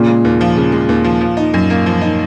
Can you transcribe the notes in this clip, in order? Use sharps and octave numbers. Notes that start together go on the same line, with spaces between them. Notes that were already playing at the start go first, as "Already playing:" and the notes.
Already playing: A#2 C#3
G#3
D#2
F3
C#3
G#3
D#2
F3
F3
D#4
F#2
A#3
F3
D#4